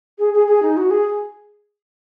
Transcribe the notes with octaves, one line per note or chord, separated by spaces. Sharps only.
G#4
G#4
G#4
D#4
F#4
G#4